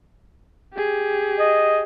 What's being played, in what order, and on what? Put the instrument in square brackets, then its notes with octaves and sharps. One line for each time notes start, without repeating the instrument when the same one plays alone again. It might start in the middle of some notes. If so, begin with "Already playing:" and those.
[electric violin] G4 G#4
[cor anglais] D#5